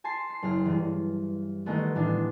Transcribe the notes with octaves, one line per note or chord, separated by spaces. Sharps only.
G#5 A5 C6 C7
C7
F#1 G#4 F6
G2 E3
D#3 G#3 A3 B3
A2 E3 G#3 A3 D4